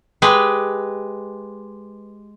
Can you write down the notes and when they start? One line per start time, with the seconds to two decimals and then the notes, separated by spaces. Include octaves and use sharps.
0.22 G#3 G4 B4